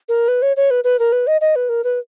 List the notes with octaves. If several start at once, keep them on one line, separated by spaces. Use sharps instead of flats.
A#4
B4
C#5
C#5
B4
B4
A#4
B4
D#5
D#5
B4
A#4
B4